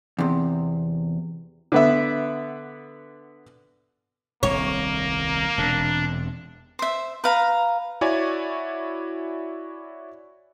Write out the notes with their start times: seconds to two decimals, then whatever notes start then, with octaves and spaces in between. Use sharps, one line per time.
0.19 E2 C3
1.72 D3 B3 E5
4.43 D#1 C2 A#3 C#5
5.58 E1 C3 D4
6.79 C5 E5
7.24 B4 F5 A#5
8.01 E4 F#4 C#5 D5 G#5 C#6